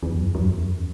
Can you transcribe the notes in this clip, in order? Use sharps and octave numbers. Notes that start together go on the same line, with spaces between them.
E2
F#2
E2
F#2
E2
F#2
E2